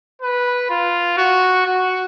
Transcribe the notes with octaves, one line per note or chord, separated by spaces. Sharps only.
B4
F4
F#4
F#4